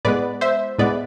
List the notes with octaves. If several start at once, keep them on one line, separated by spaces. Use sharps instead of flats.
A2 G#3 B3 B4 D5
C5 E5
A2 G#3 B3 B4 D5